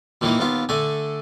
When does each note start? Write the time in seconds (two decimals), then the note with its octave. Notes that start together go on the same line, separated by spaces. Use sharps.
0.21 A#2 D#3 E3 A#3
0.39 D#2 B3 F4
0.69 D3 A3 G#5